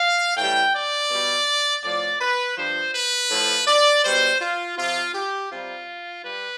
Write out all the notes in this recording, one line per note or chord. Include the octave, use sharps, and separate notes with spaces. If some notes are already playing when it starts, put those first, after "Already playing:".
Already playing: F5
A2 E3 G3 G5
D5
B2 G3
A2 F3 D5
B4
G2 F3 C5
B4
A2 F3
D5
B2 G3 C5
F4
C3 F3 F4
G4
C3 G3 F4
G3 B4